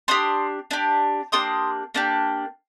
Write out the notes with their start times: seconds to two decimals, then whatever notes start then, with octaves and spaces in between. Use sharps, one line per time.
0.08 D4 G4 C6 D#6
0.71 D4 G4
1.32 A#3 D4 G4 C6 D#6
1.95 A#3 D4 G4